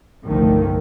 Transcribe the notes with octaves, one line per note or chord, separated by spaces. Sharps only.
G1 C2 D3 D#3 F3 A3